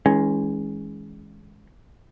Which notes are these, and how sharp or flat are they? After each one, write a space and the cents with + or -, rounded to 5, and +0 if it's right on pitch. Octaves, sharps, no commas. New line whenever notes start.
E3 -40 G#3 +0 C#4 +0